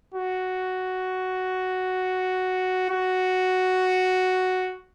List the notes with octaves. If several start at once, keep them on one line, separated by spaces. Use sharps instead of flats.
F#4
F#4